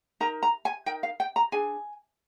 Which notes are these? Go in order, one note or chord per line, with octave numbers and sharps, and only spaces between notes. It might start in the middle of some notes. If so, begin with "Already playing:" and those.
D#4 A#4 A#5
A#5
G#5
D#4 A#4 G5
F5
G5
A#5
D4 G#4 G#5